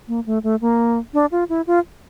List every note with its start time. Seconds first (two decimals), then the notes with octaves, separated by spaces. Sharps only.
0.08 A#3
0.26 A3
0.43 A3
0.61 A#3
1.14 D4
1.32 F4
1.49 E4
1.67 F4